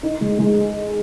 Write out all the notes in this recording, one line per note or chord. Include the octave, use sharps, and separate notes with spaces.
D#4
G#3
G#3